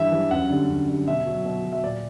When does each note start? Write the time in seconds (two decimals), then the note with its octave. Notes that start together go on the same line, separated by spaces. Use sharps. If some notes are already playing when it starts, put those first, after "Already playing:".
Already playing: G2 E3 G3 E5
0.12 E3 G3
0.31 F#2 F#5
0.50 D3 G3
0.69 F#2
0.88 D3 G3
1.07 B2 E5
1.27 F#3
1.45 B2
1.65 F#3
1.73 E5
1.84 A#2 D5